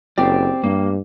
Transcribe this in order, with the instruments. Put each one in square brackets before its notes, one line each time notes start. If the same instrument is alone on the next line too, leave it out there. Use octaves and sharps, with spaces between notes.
[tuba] F#1 [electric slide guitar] C4 D5 [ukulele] G4
[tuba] G2 [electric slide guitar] A#3